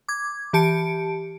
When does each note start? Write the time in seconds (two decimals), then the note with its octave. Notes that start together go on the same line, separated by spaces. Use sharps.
0.09 D6 G#6
0.53 E3 G4 A5 C#7 D7